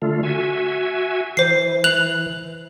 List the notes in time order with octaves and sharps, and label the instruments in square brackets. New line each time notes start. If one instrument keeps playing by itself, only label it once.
[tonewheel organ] D3 A3 F4
F#4 E5 G#5
[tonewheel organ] E3 [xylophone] C5 C7
[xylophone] F#6 F7 F#7